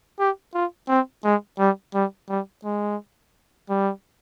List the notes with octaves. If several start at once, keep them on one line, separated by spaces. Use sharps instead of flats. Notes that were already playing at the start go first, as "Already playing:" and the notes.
G4
F4
C4
G#3
G3
G3
G3
G#3
G3